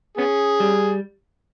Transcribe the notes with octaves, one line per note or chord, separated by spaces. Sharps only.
B3 C#4 G#4
G3